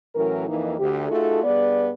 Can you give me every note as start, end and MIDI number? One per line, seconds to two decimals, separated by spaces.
0.15 0.45 45
0.15 0.45 52
0.15 0.45 54
0.15 0.45 61
0.15 0.45 70
0.49 0.74 41
0.49 0.74 52
0.49 0.74 58
0.49 0.74 63
0.79 1.06 38
0.79 1.06 67
1.09 1.42 57
1.09 1.42 63
1.09 1.42 65
1.09 1.42 66
1.09 1.42 68
1.09 1.42 69
1.44 1.90 43
1.44 1.90 59
1.44 1.90 68
1.44 1.90 71
1.44 1.90 74